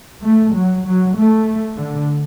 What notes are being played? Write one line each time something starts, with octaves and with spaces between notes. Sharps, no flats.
A3
F#3
F#3
A3
D3